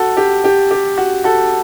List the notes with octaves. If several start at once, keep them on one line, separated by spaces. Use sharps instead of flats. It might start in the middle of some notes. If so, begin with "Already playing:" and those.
Already playing: F#4 A4
G4
G4
G4
F#4
F#4 A4